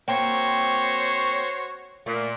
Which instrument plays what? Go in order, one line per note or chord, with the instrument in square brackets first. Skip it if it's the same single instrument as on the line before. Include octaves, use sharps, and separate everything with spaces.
[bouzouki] A#3 C4 G5 [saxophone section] F#4 C5 C#5
[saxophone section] A#2 [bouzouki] A3